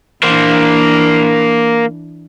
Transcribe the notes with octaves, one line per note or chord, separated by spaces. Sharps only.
E3 A#3 D4 C5